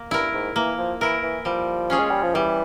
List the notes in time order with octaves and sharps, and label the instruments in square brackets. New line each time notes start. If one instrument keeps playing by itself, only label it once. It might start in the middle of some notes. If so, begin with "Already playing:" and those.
Already playing: [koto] A#3
[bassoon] G2 [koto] E4 A#4
[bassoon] G#2
[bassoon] E3 [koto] A#3
[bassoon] F3
[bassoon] E3 [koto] E4 A#4
[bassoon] E3
[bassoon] F3 [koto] G3
[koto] C#4 F4 G#4 C#5
[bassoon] G#3
G3
F3
[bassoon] E3 [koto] G3